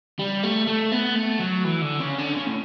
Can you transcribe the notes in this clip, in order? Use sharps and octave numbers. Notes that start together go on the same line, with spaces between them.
G3
A3
A3
B3
A3
F#3
E3
D3
C#3
D3
C#3
A2